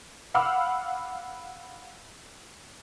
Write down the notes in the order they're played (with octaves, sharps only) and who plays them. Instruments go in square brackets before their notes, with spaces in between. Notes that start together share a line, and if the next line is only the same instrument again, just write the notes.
[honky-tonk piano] F5 F#5 B5 D6 E6 F6